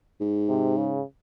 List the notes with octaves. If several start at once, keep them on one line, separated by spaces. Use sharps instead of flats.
G#2
C3
C#3